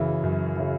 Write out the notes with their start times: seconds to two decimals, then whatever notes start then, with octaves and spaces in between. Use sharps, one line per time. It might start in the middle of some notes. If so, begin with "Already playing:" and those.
Already playing: F#2 C#3 E3
0.24 F#2
0.56 C#3 E3